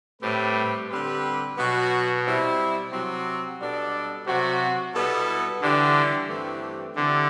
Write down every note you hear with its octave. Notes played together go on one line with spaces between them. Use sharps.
A2 G3 C4 G4 B4
D3 G3 C4 G4 B4
B2 F#3 B3 F#4
G3 C4 E4
C3 F#3 C4 F#4
B2 G3 D4 A4 D5
C3 F#3 C4 F#4
B2 G3 B3 E4 A4
D3 E3 G3 D4 G4
G2 E3 A3 C4 G4
D3 E3 A3 C4 G4 D5